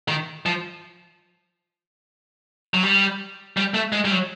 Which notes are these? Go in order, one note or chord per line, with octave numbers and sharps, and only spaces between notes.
D#3
F3
F#3
G3
G3
A3
G#3
G3
F#3